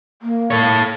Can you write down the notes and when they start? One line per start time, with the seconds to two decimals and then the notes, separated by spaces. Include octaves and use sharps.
0.22 A#3
0.51 A4 C#5